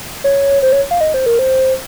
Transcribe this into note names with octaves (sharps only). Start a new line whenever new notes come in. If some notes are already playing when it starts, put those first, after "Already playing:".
C#5
C5
C#5
F5
D#5
C5
A#4
C5